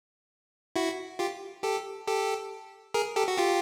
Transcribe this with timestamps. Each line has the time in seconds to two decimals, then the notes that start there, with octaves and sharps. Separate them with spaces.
0.76 E4 F#4
1.19 F4 G4
1.63 G4 A4
2.07 G4 A4
2.94 G#4 A#4
3.16 G4 A4
3.28 F#4
3.38 F4 G4